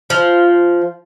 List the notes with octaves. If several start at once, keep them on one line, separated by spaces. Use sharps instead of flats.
F3